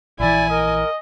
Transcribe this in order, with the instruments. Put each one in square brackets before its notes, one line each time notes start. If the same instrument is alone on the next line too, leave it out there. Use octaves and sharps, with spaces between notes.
[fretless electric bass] A#1 E3 [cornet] E4 [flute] D5 [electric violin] G#5
[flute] A#4 [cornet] D#5